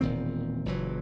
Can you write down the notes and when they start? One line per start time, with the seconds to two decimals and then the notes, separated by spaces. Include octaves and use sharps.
0.01 E1 A#2 D#3 C4
0.65 F#1 A#2 E3 F#3